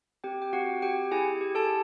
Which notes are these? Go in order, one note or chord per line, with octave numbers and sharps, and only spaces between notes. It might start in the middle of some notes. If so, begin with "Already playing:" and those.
C4 G4 G5
G5
C4 F#4 F#5
G4 G5
E4 G#4 G#5
G4
A4 A5